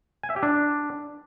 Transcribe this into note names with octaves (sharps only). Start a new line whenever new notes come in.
G#5
E5
G4
D4